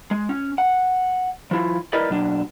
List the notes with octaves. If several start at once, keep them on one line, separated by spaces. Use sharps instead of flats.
G#3
C#4
F#5
F3 E4 F4
E4 A#4 B4 D5 D#5
B2 F#3 D4